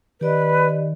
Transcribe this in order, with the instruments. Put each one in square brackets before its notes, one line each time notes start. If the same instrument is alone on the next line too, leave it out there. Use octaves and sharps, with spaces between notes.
[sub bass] D#3 [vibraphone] G4 D5 D#5 [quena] B4